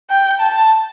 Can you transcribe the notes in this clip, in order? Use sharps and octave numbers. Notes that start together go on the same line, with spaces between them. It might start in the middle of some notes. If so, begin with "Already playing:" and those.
G5
A5